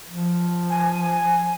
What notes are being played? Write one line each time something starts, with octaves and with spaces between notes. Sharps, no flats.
F3
G#5